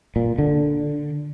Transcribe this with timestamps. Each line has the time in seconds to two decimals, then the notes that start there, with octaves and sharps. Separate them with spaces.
0.16 A#2
0.38 D3